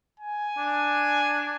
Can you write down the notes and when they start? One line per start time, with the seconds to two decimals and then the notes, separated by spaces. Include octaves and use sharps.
0.20 G#5
0.58 D4